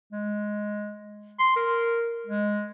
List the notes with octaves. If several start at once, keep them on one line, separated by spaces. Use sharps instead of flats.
G#3
C6
A#4
G#3